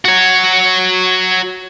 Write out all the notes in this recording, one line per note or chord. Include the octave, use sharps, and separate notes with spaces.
F#4 C#5